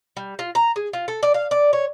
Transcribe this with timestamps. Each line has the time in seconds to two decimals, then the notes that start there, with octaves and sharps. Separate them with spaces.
0.17 G3
0.39 F4
0.55 A#5
0.76 G#4
0.93 F4
1.08 A4
1.23 D5
1.34 F5
1.51 D5
1.73 C#5